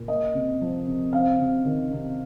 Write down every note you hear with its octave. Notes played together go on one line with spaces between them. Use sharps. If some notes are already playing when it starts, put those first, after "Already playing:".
Already playing: A#2
A#3 D#5
C3
F3
C3
C4 F5
C3
D#3
C3